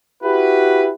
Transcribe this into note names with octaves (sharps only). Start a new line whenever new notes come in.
E4 F#4 G4 B4